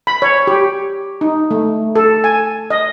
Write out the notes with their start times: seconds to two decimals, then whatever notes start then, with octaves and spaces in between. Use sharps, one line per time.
0.07 B5
0.22 C#5
0.47 G4
1.21 D#4
1.51 A3
1.96 A4
2.24 G#5
2.70 D#5